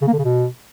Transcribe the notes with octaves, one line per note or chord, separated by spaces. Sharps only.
C#3
A#3
D3
C#3
B2